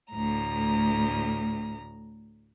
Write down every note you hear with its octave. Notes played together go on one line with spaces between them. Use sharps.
D2 A2 A#5